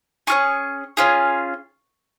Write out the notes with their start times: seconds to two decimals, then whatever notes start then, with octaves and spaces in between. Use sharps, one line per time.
0.27 C#4 F4 G#4 C#6
0.97 C#4 F4 G#4